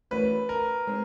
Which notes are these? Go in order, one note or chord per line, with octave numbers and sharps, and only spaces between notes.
E3 A3 C#4 F#4 A#4 B4
A#4
G#3 C4 D#4